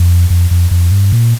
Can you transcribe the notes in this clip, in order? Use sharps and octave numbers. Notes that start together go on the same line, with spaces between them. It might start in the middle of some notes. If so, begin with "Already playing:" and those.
Already playing: F2
F2
F2
F2
G2
A#2